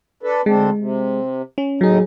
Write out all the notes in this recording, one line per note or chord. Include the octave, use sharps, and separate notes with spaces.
D4 A4 B4
D2 G#3 C4 D4
C3
C#4
D#2 A2 F#3 D#4 G#4